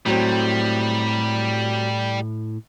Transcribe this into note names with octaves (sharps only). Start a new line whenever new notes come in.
A2 F#3 G3 C4